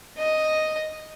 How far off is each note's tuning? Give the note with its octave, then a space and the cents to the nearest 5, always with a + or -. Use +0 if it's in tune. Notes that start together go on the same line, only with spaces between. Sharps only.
D#5 +0